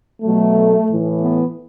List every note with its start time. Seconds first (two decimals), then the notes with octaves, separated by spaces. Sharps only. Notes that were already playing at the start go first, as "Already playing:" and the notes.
0.23 B2 F#3 A3
0.89 A2 E3
1.22 B3